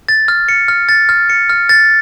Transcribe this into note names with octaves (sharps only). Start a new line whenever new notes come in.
A6
F6
C#7
F6
A6
F6
C#7
F6
A6